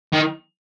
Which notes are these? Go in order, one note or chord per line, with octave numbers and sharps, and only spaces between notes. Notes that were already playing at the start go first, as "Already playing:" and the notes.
D#3